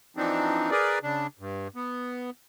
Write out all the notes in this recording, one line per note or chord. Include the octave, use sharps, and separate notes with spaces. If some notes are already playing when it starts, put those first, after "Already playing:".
E3 F3 C4 D4 D#4
G#4 A#4 B4 D5
C#3 D4
G2
B3